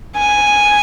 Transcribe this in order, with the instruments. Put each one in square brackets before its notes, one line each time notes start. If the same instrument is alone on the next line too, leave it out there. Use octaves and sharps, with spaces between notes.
[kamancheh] G#5